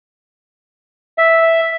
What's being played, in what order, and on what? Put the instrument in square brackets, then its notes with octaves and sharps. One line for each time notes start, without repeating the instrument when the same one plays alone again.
[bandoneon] E5